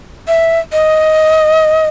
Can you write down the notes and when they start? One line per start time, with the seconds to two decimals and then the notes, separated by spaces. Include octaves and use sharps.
0.28 E5
0.72 D#5